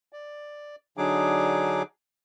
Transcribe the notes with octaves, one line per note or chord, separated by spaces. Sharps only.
D5
D3 F#3 D4 D#4 G#4 D6